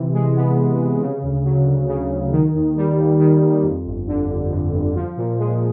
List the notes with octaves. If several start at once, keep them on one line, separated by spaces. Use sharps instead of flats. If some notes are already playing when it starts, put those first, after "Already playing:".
Already playing: C3 E3
G#3
B3
E3
C3
C#3
D2
F#3
D2
C#3
D2
D#3
D#2
G3
D#2
D#3
D#2
F2
G1
D3
G1
F2
G1
F3
A#2
G#3